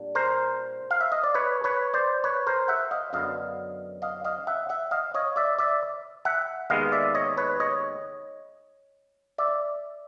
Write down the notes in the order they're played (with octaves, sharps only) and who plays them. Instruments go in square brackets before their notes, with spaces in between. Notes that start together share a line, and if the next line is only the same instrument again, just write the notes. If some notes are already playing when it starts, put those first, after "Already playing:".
Already playing: [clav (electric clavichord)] A#2 G3 D4
A#4 C5
F5
E5
D#5
D5
B4 C#5
B4 C#5
C5 D5
B4 C#5
A#4 C5
E5 F#5
D#5 F5
F#2 D3 F#3 B3 D#5 F5
D#5 F5
D#5 F5
E5 F#5
E5 F#5
D#5 F5
C#5 D#5
D5 E5
D5 E5
E5 F#5
D#2 D#3 G#3 B3 D#5 F5
D5 E5
C#5 D#5
B4 C#5
C#5 D#5
D5 E5